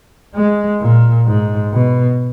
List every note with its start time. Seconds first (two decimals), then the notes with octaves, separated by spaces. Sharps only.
0.35 G#3
0.81 A#2
1.27 G#2
1.73 B2